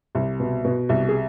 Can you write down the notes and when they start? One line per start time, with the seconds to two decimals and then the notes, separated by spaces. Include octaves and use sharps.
0.15 C2
0.40 B2
0.64 B2
0.89 C2
1.08 G#4